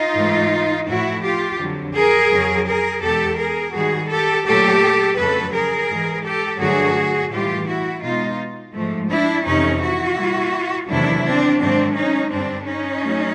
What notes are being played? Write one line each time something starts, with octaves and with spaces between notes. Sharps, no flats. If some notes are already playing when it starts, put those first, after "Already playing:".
Already playing: D#4 F4
G#2 E3 A3
A2 F3 A3 E4 F#4
F4 G4
F2 D3 F#3
G#4 A#4
F2 C#3 F#3
G#4 A#4
E2 B2 G#3 G4 A4
G#4 A#4
G#2 D#3 G3 F#4 G#4
G4 A4
A#2 F#3 A3 G4 A4
F2 C#3 F#3 A3 A4 B4
G#4 A#4
G#2 E3 G#3
G4 A4
G2 D3 F#3 A3 F#4 G#4
A2 E3 G3 F4 G4
E4 F#4
B2 G#3 D#4 F4
G#2 F3 A3
D4 E4
F2 C3 E3 A3 C#4 D#4
E4 F#4
A#2 G3
E2 C3 D#3 F#3 A3 D4 E4
C4 D4
G#2 D#3 F#3 A3 C4 D4
C#4 D#4
G2 D3 G3 C4 D4
C#4 D#4
F#3 A3